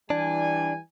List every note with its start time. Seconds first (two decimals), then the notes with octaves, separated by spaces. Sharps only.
0.10 E3 G3 D4 G#5